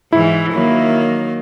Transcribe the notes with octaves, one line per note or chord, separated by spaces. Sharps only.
G#2 E3 E4
D#3 F#3 A#3